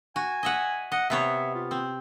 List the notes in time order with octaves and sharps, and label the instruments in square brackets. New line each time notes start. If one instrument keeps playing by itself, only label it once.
[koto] F#4 [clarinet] G#5
[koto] D#5 E5 F#5
[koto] D#5 [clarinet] F#5
[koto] C3 B3 C#5 [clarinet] E5
[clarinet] F4
[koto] C4